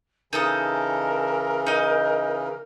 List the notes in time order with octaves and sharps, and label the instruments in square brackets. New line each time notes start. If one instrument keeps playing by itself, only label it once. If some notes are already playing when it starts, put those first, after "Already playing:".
[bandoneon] C#3 E3 [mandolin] D#4 A4 D#6 [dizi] A#4
[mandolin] D#4 D#5